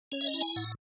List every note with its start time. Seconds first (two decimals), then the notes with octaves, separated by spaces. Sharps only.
0.12 C#4 C#5
0.21 E5
0.27 D#5
0.34 E4
0.41 G#5
0.56 A2 F#5